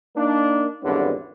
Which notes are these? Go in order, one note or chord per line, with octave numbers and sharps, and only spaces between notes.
A#3 D4 D#4
G#1 E2 G2 D3 B3 C#4